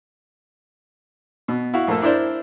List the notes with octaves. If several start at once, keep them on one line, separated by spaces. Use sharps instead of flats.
B2
E4 F#4 F5
A#1 A3 A#3 A4
D4 E4 A#4 C5 D5